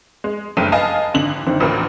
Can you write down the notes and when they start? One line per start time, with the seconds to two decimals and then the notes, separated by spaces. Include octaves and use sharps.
0.24 G#3
0.57 F#1 G2 A3 G5 D#7
0.72 B4 D#5 F5 G#5 A5
1.14 G#1 D3 F#7
1.47 F#1 D3 D#3 C4
1.60 A1 D2 A#2 F3 A#4